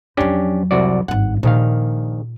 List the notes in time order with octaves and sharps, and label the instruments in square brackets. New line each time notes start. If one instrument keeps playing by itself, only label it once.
[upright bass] F2 F#3 [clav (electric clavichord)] C#4 D4 G4
[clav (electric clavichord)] C2 F#4 D5
[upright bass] G#1 G2 [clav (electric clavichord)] F#5
[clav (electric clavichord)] A#1 D#3 F5 [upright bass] A#2 F4